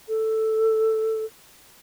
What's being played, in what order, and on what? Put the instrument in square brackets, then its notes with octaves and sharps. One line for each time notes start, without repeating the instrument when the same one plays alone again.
[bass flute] A4